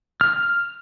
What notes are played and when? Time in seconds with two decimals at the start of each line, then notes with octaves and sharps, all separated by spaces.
0.21 F6